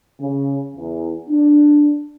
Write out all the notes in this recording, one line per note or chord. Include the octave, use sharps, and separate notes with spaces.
C#3
E2
D4